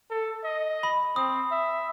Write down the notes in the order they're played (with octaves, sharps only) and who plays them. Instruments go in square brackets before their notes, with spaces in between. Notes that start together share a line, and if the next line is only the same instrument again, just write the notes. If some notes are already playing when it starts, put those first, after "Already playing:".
[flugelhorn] A4
D#5
[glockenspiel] B5
[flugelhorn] C4 [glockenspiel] D#6
[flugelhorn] E5